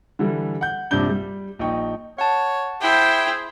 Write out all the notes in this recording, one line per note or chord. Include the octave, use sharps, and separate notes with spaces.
D3 E3 G3
F#5 G6
A#1 G2 C3 D4 G6 G7
G3
A#1 D#4 D#5 G5 C#6
C#5 F#5 A5
E4 G#4 C5 G5